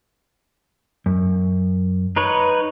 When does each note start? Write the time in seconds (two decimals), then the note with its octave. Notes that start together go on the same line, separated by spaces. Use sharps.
1.06 F#2
2.16 D#4 B4 C#5